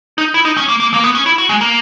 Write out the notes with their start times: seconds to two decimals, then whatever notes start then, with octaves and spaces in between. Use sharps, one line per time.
0.18 D#4
0.34 E4
0.45 D#4
0.57 C#4
0.68 A#3
0.80 A#3
0.94 A#3
1.03 B3
1.15 C#4
1.26 E4
1.38 F#4
1.49 G#3
1.61 A#3